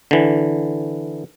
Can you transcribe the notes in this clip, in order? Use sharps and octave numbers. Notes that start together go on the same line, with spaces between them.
D3 E3